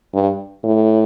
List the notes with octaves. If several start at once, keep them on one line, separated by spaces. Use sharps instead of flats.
G2
A2